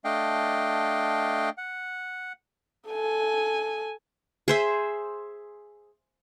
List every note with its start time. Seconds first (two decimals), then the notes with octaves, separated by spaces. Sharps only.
0.05 A3 D4 D#5 F5 G5
1.58 F#5
2.89 A4 G#5
4.48 G#4 C5 E5